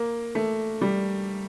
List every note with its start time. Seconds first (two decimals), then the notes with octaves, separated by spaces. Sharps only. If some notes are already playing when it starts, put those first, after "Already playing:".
Already playing: A#3
0.35 A3
0.81 G3